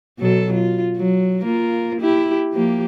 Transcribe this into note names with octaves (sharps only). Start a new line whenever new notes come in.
B2 F#3 A4
F4
F#3
A#3 F4 A#4
E4 G4
F3 A#3 G4